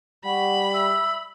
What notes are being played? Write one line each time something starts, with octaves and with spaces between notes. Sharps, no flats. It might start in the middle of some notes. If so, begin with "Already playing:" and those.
G3 F#5 B5 C#6
E5 E6